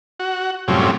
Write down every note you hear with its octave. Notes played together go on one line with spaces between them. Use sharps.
F#4
F#2 A2 C3 F3 G3 C#4